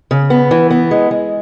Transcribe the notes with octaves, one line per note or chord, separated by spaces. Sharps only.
C#3
B3
E3
B3
G#3
G#3